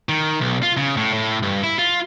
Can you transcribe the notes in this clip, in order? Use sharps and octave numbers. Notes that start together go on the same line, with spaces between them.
D#3
B1
F4
C#3
A2
A2
G2
E4
F4